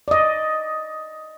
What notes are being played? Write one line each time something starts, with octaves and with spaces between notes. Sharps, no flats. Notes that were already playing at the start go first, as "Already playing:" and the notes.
D5 D#5